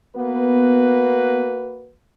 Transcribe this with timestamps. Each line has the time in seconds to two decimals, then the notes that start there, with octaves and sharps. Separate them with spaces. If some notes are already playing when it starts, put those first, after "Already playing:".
0.16 A#3 B3 F#4 B4